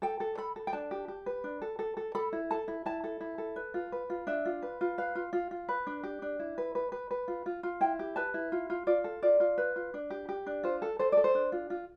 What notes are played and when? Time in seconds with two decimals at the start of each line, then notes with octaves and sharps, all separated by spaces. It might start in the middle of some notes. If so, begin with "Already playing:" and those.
0.02 A4 G5
0.20 A4
0.38 A4 B5
0.56 A4
0.67 G5
0.73 D4 A5
0.91 G4
1.08 G4
1.26 B4
1.44 D4
1.62 A4
1.79 A4
1.97 A4
2.15 A4 B5
2.33 E4
2.51 A4 A5
2.68 E4
2.86 E4 A5
3.04 A4
3.21 E4
3.38 A4
3.56 B4
3.74 F4
3.92 B4
4.10 F4
4.27 D4 E5
4.45 F4
4.62 B4
4.81 F4
4.98 B4 F5
5.15 F4
5.33 F4
5.51 F4
5.69 B4
5.87 D4
6.03 G4
6.22 D4
6.39 E4
6.58 B4
6.75 B4
6.92 B4
7.11 B4
7.28 F4
7.46 F4
7.63 F4
7.81 E4 G5
7.99 G4
8.16 B4 A5
8.34 E4
8.52 F4
8.70 F4
8.87 F4 D5
9.04 A4
9.22 F4 D5
9.40 F4
9.58 B4
9.76 F4
9.94 D4
10.10 G4
10.29 G4
10.46 D4
10.63 F4 C5
10.82 A4
10.99 A4 C5
11.12 A4 D5
11.24 C5
11.35 D4
11.52 F4
11.70 F4